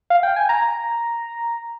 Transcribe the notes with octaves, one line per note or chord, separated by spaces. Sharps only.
F5
G5
G#5
A#5